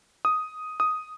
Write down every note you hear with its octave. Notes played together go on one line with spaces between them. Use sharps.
D#6
D#6